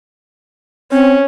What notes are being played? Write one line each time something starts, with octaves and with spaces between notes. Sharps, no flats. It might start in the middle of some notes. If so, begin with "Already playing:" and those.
C4 C#4